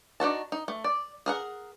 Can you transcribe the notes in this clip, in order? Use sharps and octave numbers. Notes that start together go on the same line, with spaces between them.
D4 D#4 F#4 A5
D#4
A3
D5
G#4 A#4 F#5